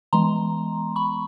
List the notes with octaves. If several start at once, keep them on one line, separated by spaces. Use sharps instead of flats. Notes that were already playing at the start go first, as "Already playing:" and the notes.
E3 G#3 B3 A#5 C6
B5 C#6